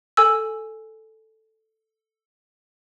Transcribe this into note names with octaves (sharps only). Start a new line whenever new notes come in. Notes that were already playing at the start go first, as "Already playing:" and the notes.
A4 G#5 E6